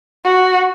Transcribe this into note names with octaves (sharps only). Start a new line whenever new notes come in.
F#4